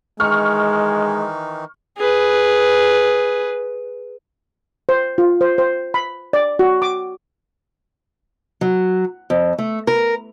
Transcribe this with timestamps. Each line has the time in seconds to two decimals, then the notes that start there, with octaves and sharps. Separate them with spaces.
0.20 D#3 E3 G#3 D#4 C#6 F6
1.98 G#4 B4
4.89 C5
5.18 F4
5.41 C5
5.58 C5
5.94 B5
6.33 D5
6.59 F#4
6.82 D6
8.61 F#3
9.30 F2
9.58 A3
9.87 A#4